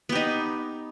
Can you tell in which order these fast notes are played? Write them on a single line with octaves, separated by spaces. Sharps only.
B3 G4 D#4